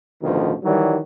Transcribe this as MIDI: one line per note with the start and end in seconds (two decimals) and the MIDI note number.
0.22 0.53 33
0.22 0.53 38
0.22 0.53 47
0.22 0.53 51
0.22 0.53 53
0.63 0.96 51
0.63 0.96 52
0.63 0.96 54
0.63 0.96 55